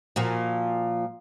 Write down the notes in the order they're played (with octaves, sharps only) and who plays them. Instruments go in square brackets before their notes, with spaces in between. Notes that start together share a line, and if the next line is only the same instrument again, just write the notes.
[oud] A#2 F3 F#4